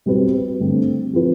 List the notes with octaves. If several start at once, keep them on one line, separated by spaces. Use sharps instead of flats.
B2 G3 C4 G4 B4
G2 D3 A3 C4
F3 C4 F4 B4